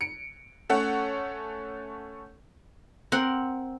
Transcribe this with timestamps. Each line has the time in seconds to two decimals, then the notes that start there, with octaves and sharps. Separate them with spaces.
0.01 C#7 D7
0.69 A3 C#4 A4 C#5 F#5
3.12 C4 A#4 F#5